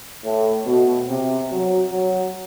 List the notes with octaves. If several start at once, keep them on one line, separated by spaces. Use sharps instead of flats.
A2
B2
C3
F#3
F#3